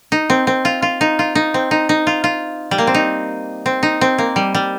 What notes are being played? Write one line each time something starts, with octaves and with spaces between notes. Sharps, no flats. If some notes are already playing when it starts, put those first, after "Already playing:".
D#4
C4
C4
F4
F4
D#4
F4
D#4
C4
D#4
D#4
F4
F4
G3
A#3
C4
D#4
C4
D#4
C4
A#3
G3
G3